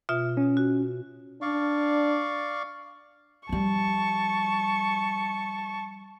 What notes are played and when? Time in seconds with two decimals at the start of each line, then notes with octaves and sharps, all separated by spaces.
0.09 B2 F4 E5
0.37 C#4
0.57 F#4
1.42 D4 D5 F5 C#6
3.49 F3 G3 A5 C#6